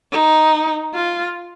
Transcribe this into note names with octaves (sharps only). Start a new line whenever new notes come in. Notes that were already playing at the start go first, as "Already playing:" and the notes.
D#4
F4